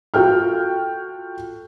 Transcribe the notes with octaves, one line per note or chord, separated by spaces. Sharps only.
F4 F#4 A4 G5 F6